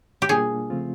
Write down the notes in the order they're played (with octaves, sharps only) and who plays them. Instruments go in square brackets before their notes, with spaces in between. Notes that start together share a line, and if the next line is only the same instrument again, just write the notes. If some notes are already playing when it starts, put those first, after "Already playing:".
[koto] G4
[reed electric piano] B2 G3 A#3 D4 F4 [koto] G#4
[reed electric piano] C#3 F3 A3 C4 F4